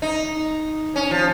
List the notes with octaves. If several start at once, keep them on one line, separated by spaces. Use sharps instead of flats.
D#4
C#4
F3